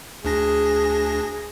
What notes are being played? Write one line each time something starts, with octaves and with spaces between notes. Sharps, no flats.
D2 D4 G#4 A#6